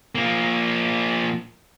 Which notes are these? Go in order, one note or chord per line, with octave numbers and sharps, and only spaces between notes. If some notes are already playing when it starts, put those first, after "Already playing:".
F3 A#3